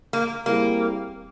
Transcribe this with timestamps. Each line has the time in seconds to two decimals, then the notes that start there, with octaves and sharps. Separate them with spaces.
0.13 A#3
0.46 G3 A#3 C4 E4 G#4